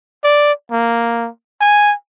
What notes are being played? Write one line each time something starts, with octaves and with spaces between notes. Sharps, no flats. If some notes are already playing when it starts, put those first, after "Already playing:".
D5
A#3
G#5